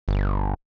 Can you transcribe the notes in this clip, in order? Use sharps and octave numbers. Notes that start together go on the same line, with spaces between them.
G1